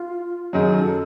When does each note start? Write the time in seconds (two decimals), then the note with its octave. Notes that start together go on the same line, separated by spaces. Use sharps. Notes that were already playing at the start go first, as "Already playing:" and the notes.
Already playing: F4
0.53 F#2 D#3 F#3 G#4
0.75 A4